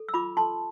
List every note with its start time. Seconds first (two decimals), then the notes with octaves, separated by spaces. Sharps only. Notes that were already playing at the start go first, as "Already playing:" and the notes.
Already playing: A4
0.09 E6
0.14 F4 B5 D6
0.37 A4 A5 C6